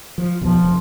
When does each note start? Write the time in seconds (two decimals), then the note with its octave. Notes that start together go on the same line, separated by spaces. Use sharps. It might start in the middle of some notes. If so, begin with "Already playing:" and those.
0.18 F3
0.41 B1 E2 F3
0.62 F1